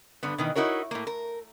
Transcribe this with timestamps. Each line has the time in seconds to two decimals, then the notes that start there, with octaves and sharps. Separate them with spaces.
0.23 G2 D3 B3
0.38 B2 D#3 E3
0.55 D#4 E4 F#4 A#4 C#5
0.91 A2 A#3
1.07 A#4